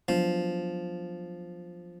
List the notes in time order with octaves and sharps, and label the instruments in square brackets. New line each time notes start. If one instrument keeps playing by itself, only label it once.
[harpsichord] F3 [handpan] F#3 B3 D4